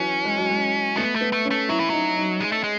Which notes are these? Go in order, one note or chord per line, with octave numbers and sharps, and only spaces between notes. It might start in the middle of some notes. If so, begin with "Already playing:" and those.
Already playing: E3 F#3 C#4
G#3
F#3
G#3
A3 B3
A3
B3
A3
C#4
A3
F#3 E4
E3
F#3 D#4
D#4
G#3
A3
G#3